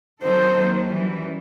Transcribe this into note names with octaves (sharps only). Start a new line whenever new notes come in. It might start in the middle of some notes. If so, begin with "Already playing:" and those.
D#3 F#3 C4 D#4 A4 C5
D#2 D#3 F#3
F#2 E3 G3